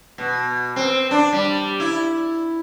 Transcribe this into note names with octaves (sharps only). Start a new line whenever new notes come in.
B2
C4
D4
G3
E4